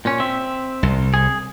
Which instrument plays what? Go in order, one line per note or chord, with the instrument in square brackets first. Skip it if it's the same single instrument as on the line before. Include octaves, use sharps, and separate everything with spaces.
[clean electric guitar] A#2 C#4
C4 E5
[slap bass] C2
[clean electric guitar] G#4